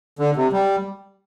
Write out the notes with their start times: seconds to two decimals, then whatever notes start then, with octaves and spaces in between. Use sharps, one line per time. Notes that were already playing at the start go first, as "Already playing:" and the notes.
0.19 D3
0.36 C3
0.53 G3